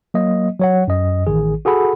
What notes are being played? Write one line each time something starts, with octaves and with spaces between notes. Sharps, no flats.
F#3 A#3 D#5
F#3 C#5 F#5
F#2 D#5
A1 D#3 G#4
F#4 G#4 A4 F#5 B5